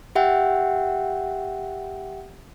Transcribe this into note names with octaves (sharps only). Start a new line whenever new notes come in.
G4 E5 F#5 G5